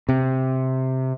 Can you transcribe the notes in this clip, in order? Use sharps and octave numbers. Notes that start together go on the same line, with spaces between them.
C3